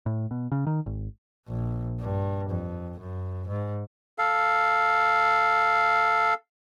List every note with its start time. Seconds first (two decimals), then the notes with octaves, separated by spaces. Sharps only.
0.06 A2
0.31 B2
0.52 C#3
0.67 D#3
0.86 G#1
1.47 A#1
2.00 G2
2.50 F2
2.99 F#2
3.48 G#2
4.18 A4 F5